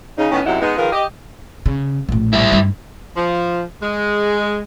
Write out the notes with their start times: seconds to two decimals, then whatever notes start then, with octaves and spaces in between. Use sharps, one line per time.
0.17 C#3 D#4
0.31 A2 D#3 B3 C#4
0.46 F#2 C3 F#3 D#4 E4 F#5
0.61 G#3 B3 D#4
0.77 D#3 F3 F4 G#4 A#4 B4
0.92 G4 D#5
1.66 C#3
2.09 A#1 A2
2.33 G3 E4
2.52 G2
3.16 F3
3.82 G#3